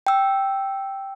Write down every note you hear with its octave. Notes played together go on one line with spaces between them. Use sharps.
G5 E6